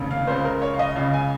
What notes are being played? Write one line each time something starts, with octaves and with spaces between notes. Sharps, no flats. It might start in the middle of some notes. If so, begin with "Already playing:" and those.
Already playing: F1 D#2 C#3
F5
C#2 C#3 C5
A#4
C#5
F5
D#5
C#2 C#3 F5
G#5